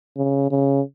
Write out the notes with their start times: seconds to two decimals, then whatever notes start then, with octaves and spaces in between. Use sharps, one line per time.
0.17 C#3
0.51 C#3